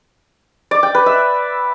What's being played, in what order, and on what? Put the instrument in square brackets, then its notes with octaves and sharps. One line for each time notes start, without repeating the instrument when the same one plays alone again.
[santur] D5
G5
B4
E5